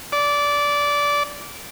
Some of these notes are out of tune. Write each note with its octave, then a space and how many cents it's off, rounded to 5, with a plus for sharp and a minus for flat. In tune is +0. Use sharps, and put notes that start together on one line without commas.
D5 -20